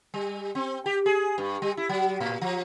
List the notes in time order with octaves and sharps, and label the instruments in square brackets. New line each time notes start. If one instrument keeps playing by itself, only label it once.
[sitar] G3
C4
G4
G#4
G2
G3
E4
F#3
A2
F3